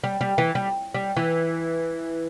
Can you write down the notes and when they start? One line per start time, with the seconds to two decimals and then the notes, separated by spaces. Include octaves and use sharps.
0.04 G3
0.21 G3
0.38 E3
0.55 G3
0.95 G3
1.16 E3